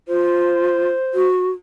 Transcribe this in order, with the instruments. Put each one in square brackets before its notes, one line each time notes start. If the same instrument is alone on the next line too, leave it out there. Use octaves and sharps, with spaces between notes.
[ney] F4 [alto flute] C5
[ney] F#4